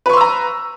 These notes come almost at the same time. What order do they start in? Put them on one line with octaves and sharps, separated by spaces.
B4 C#6 C6 E6 A#5